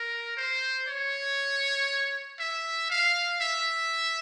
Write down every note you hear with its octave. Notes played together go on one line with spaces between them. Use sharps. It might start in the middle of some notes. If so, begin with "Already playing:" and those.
Already playing: A#4
C5
C#5
E5
F5
E5